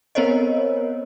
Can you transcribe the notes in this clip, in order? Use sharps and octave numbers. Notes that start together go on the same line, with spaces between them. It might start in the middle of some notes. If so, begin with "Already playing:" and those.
B3 C4 A#4 C5 C#5 D#5